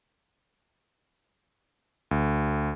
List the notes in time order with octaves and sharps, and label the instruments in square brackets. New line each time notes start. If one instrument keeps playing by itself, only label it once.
[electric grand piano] D2